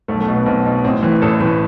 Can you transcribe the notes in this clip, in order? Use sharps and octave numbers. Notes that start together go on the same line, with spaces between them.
B1 A3
A3
B2
B3
B1 C4
B2
A1 C4
A2 E3
A1 A4
A2 E3 B4